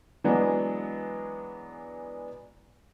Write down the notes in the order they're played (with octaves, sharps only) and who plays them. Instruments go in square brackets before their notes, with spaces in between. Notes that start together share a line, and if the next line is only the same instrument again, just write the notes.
[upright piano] E3 F#3 G#3 B3 D4